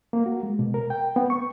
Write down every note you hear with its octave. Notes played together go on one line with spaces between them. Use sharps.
A#3
F#4
G#3
B2
A#4
G5
B3
C#6